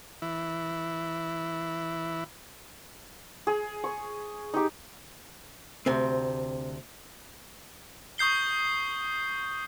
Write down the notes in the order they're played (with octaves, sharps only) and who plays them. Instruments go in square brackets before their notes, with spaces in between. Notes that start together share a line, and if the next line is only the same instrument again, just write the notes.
[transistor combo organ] E3 E4
[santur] G#4
C#6
D#4 G4
[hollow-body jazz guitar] D2 C3 C4
[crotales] C#6 D#6 G6 C7 G7